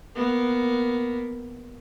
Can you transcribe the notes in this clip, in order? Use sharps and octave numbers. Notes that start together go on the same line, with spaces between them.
A#3 B3